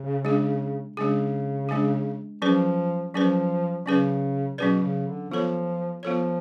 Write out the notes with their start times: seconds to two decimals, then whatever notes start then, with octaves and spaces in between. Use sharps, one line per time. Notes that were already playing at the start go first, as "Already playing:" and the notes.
Already playing: C#3
0.25 G#3 D4 G#4
0.96 C#3 G#3 D4 G#4
1.69 G#3 D4 G#4
2.42 F3 F#3 C#4 G#4 B4 D5
3.13 F3 F#3 C#4 G#4 B4 D5
3.86 C#3 F#3 C#4 G#4 B4 D5
4.58 B2 F#3 C#4 G#4 B4 D5
4.82 C#3
5.07 D3
5.31 F3 B3 F4 A4 C#5
6.03 F3 B3 F4 A4 C#5